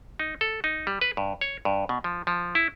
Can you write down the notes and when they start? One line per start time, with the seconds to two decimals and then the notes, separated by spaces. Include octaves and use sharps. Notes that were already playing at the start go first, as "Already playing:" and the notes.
0.19 D#4
0.41 A4
0.64 D#4
0.87 G3
1.01 B4
1.17 G2
1.41 C#5
1.65 G2
1.89 B2
2.04 F3
2.27 F3
2.55 E4